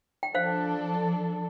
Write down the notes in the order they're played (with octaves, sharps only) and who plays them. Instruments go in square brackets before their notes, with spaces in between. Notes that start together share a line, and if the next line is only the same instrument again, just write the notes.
[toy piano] G5
[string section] F3 D4 A4 [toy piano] C5 F5